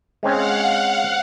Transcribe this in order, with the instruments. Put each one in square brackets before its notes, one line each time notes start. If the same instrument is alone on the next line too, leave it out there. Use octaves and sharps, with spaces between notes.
[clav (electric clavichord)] G#3 C4 C#4 [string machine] F5 F#5